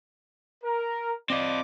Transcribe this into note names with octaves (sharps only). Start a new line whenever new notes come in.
A#4
C4 F4 D5 D#5 D6